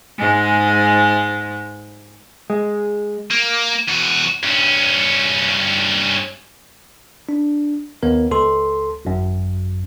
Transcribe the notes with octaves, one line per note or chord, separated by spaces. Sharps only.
G#2 G#3
G#3
A#3
E2 F#4
G2 C#4
D4
D#2 B3 A#4
C#2 A4 C6
G#1 F#2